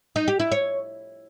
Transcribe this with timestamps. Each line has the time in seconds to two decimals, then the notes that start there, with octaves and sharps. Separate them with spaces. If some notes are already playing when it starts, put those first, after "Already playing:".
0.16 D#4
0.28 G4
0.40 E4
0.52 C#5